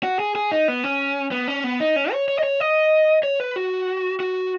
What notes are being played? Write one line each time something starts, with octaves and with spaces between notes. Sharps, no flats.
F#4
G#4
G#4
D#4
B3
C#4
B3
C#4
B3
D#4
C#4
C#5
C#5
D#5
C#5
D#5
C#5
B4
F#4
F#4